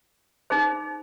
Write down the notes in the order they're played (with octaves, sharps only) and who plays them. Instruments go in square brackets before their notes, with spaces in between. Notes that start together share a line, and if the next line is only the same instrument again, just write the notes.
[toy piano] D#4 G#4 C5